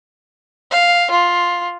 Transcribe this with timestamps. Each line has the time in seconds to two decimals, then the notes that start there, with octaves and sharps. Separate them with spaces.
0.71 F5
1.10 F4